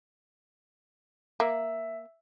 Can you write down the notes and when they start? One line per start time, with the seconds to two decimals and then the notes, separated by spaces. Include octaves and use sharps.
1.40 A#3 E5 E6